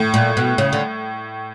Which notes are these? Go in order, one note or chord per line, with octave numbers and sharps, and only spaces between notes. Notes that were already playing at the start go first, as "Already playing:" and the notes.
Already playing: A2
A#2
B2
C#3
D3